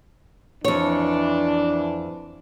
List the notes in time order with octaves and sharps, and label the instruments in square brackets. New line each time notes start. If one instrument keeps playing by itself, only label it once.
[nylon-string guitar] F2 C#5 [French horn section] E3 D4